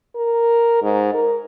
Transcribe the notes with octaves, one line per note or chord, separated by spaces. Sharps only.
A#4
G#2
A#4